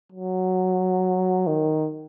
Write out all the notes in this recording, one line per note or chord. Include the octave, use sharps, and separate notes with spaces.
F#3
D#3